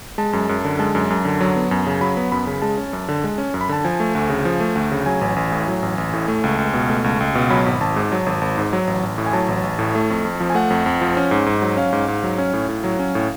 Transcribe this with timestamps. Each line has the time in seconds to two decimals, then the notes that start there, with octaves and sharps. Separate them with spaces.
0.18 G#3 A5
0.33 F#2
0.49 F#2
0.65 D3
0.79 G#3 A5
0.95 F#2
1.10 F#2
1.25 D3
1.41 F#3
1.56 B3
1.71 F#2
1.87 C#3
2.01 F#3 B5
2.17 B3
2.32 F#2 B5
2.47 C#3
2.62 G#3 A5
2.78 C#4
2.93 F#2
3.09 D3
3.24 G#3
3.38 C#4
3.54 F#2
3.61 B5
3.69 D3 A5
3.84 F3 G#5
4.00 A3
4.15 D2
4.29 C#3
4.45 F3
4.60 A3
4.75 D2
4.91 C#3
5.06 F#3 G#5
5.21 A1
5.36 A1
5.52 A2
5.68 F#3
5.83 A1
5.98 A1
6.13 A2
6.28 A3
6.44 C#2
6.58 C#2
6.74 B2
6.90 A3
7.04 C#2
7.20 C#2
7.35 B2
7.50 F#3 B5
7.66 G#1
7.80 G#1 A5
7.96 G#2
8.12 F#3
8.26 G#1
8.41 G#1
8.58 G#2
8.73 F#3
8.87 A1
9.03 A1
9.18 A2
9.26 G#5
9.33 F#3 A5
9.48 A1
9.63 A1
9.79 A2
9.95 A3
10.10 F2
10.25 F2
10.40 F3
10.50 G#5
10.55 A3 F#5
10.70 F2
10.86 F2
11.01 F3
11.17 C#4
11.31 G#2
11.46 G#2
11.62 F#3
11.77 C#4 F5
11.93 G#2
12.08 G#2
12.23 F#3
12.38 C#4
12.53 A2
12.68 A2
12.84 F#3
12.99 C#4
13.15 A2